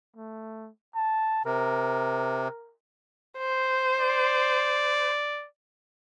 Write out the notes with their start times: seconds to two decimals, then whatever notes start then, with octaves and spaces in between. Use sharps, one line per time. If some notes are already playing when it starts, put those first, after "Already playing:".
0.16 A3
0.95 A5
1.45 C3 A#4
3.38 C5
4.00 D5